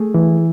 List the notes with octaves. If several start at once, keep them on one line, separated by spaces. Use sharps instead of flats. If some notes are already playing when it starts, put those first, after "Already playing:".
Already playing: A3 G#4
E3